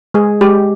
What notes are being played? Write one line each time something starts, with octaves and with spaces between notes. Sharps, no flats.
G#3 G#4
G#3 G4